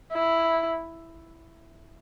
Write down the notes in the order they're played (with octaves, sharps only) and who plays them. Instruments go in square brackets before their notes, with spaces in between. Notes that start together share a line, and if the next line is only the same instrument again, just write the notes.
[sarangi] E4